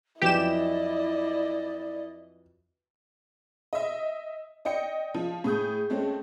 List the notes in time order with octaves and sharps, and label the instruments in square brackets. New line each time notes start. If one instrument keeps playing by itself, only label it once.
[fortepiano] F2 E3 F#3 [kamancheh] E4 D#5 [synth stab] G4 E7 [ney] D5
[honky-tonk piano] D#5 E5
D5 D#5 G5 C#7
F3
A2 G#4 D#6 G6
G#3 A3 C4 C#4